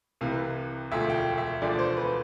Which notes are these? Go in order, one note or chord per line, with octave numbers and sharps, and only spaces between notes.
C2 C3 E3 F5
E1 D2 D3 F3 E5
G5
F5
E5
E1 D2 D3 F3 D5
C5
B4